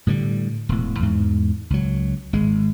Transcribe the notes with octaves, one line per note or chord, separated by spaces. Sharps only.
A2 D3 F#3 G3
E1 A2
E2 G#2
C#2 F#3
G#1 G#3